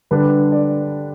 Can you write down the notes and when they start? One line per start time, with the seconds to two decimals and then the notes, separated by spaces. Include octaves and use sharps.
0.11 D3 G3 D4 B4
0.52 D5